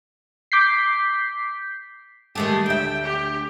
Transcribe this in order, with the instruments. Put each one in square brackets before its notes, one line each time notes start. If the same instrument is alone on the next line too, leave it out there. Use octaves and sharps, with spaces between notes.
[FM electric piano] D6 G6 B6 C7
[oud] D#3 G#3 G4 [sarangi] A3
[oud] D2 E5 [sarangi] G5
[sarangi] G4